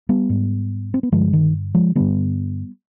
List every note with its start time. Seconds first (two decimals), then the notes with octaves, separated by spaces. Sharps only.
0.09 G3 B3
0.29 G#2
0.94 C4
1.03 B3
1.12 G2 D3 F3 G#3
1.33 D#3
1.75 F3 G#3
1.95 G2 D3 G3 B3